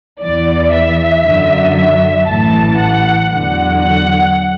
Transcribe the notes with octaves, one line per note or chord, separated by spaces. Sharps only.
E2 E3 D5
E5
F#2 D3 F#3
E5
A1 A2 E3 A5
F#5
E2 D3 F#3 F#5
F#5